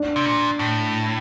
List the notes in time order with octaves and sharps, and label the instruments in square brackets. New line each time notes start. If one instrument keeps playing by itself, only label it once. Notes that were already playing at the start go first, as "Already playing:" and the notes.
Already playing: [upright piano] D4
[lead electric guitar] C3
A#2
A2